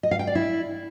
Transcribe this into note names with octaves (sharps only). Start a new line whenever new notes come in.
D#5
F5
G5
D5
E4